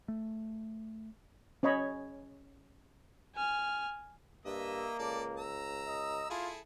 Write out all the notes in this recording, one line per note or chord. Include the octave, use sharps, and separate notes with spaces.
A3
C#4 C#5 D#5 B5
G#5 F6
G2 A#3 D#5 E5 E6
C#2 A4 D5
A#5 E6
D#5
E4 F4 G#4 A4